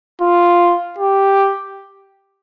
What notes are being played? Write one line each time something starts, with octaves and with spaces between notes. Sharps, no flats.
F4
G4